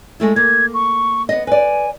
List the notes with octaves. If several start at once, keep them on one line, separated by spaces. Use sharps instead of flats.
G#3 A3 E4
A#3 G#6
C#6
B3 D#5
B4 D5 G#5